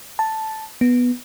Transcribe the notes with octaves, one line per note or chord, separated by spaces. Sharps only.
A5
B3